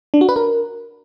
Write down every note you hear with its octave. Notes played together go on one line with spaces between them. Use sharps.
D4
F#4
B4
A#4